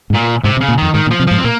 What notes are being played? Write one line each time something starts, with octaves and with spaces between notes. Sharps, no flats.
G#2
A#2
G#2 C3
C3
C#3
A#2
F2 D#3
G#2 D#3
A#2
F3
C3
G#2 F3
C4
A#2 A#3